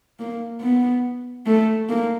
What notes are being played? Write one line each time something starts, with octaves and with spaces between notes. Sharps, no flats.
A#3
B3
A3
A#3